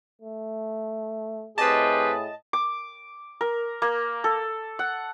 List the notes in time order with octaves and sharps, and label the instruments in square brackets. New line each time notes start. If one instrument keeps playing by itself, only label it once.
[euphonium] A3
[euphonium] A2 [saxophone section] C4 G4 B4 [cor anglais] G#4 [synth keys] D#5 A5
[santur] D6
A#4
A#3
A4
F#5